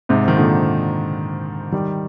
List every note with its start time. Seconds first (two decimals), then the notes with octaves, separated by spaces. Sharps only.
0.09 G#2 C3
0.28 D#3
0.37 A#2 D3
1.72 D#3 G3